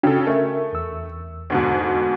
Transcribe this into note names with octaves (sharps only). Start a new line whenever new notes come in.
C#3 D4 F#4 A4 G5
A3 A#4 E5
E2 E6
D2 G#2 B2